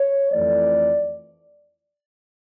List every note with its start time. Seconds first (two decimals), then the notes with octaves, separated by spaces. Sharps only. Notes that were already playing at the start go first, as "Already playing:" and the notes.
Already playing: C#5
0.32 F2 E3 A3 D5